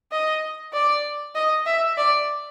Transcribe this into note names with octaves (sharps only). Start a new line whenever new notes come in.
D#5
D5
D#5
E5
D5